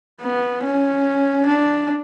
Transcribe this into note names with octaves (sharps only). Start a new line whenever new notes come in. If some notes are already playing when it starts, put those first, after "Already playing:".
B3
C#4
D4